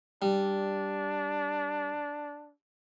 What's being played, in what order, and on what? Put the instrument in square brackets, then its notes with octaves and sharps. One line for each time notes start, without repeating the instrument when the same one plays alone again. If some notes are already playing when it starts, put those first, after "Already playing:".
[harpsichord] G3 [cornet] D4